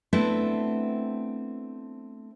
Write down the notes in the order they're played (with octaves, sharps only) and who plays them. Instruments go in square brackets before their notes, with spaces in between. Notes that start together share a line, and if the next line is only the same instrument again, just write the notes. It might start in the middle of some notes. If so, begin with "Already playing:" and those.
[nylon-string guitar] A3 B3 C4 D4 E4